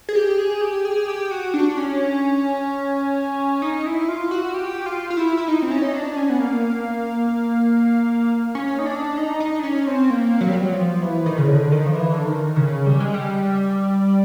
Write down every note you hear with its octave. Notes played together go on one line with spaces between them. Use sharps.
G#4
G4
G#4
G4
G#4
G4
F#4
D4
C#4
D#4
E4
F4
F#4
G4
F4
F4
E4
E4
D#4
C4
C#4
D#4
D4
C#4
B3
A#3
C#4
D#4
D4
D#4
D#4
D4
C#4
C4
A#3
F#3
G3
F#3
F3
E3
D#3
C#3
D3
D#3
F3
E3
D3
D#3
C#3
G3
G#3
G3